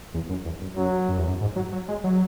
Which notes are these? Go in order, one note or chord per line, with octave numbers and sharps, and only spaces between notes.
E2
F#2
E2
F#2
F#2 F#3
F#2
E2
F#2
G#2
F#3
F#3
G#3
F#3